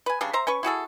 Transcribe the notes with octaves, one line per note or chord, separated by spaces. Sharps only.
B4 G#5
C#3 G3 D4
C5 E5 A#5
C#4 B4 C#6
E4 F#4 G#4 A4